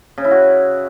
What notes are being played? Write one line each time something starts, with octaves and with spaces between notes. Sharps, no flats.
C#3
E4
F#4